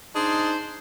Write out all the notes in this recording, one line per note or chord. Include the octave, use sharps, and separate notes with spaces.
D4 D#4 G#4 C5